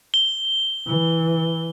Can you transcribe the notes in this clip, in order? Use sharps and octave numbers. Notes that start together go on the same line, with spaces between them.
G7
E3